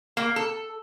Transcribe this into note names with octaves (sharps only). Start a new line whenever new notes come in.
A#3
A4